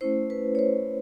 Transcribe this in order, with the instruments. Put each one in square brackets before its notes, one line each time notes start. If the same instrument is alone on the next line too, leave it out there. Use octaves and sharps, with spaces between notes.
[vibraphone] A3 C#4 E4 C5
B4
C#5
C5